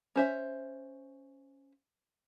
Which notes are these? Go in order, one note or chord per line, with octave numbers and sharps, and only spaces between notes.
C#4 C5 E5